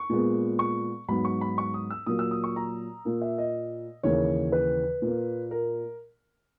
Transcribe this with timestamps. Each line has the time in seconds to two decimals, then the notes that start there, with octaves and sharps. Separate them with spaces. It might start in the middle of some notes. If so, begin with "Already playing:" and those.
Already playing: C#6
0.10 A#2 G#3 B3
0.59 C#6
1.08 G#2 F#3 B3 B5
1.25 C#6
1.41 B5
1.58 C#6
1.74 D#6
1.90 E6
2.07 A#2 F#3 A#3 D#6
2.19 E6
2.31 D#6
2.44 C#6
2.56 A#5
3.05 A#2 A#3
3.22 E5
3.38 D#5
4.03 D#2 C#3 E3 C#5
4.52 B4
5.02 A#2 A#3
5.51 A#4